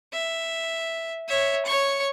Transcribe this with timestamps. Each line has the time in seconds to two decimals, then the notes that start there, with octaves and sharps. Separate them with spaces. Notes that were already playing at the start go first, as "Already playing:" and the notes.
0.13 E5
1.28 C#5 E5
1.66 C#5 C#6